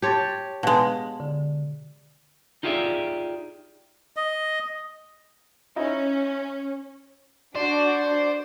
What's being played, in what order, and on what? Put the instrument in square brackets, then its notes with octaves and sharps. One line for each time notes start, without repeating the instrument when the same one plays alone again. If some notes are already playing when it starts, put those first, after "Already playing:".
[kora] G4 C#5 [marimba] A5 C6 A6
[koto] B2 G#3 [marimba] F5 A5
[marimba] D3
[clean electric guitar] D#4 F4 G4 G#4 D5 E5
[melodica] D#5
[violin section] C#4 [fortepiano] D#4 E4 D#5
[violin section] D4 F#4 [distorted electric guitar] C5 [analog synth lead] D5